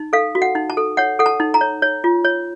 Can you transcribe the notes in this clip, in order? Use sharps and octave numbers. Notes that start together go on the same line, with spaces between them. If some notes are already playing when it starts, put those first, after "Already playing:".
Already playing: D#4
A4 F5
F#4
F#5
D#4
A5
A4
C#5 F#5
A4 F#5
A5
D#4
A#5
C#5
C#5
F4
C#5